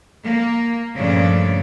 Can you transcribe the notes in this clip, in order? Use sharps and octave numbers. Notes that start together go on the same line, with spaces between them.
A#3
G2 A#2 C#3 F3 A3 D4